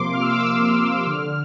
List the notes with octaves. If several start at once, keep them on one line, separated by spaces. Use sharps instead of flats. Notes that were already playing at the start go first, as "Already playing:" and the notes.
Already playing: C3 F3 A#3 C6 D6
C3 F6
E6
D6
E6
F3 A#3 F6
D3 F6